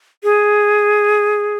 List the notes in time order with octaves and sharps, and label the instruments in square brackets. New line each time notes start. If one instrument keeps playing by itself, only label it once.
[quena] G#4